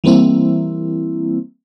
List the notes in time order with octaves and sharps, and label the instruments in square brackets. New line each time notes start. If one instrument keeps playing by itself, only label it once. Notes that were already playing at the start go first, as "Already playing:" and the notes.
[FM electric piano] E3 G3 A#3 C4 E4